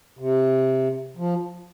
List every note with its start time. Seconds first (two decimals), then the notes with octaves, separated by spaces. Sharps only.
0.19 C3
1.17 F3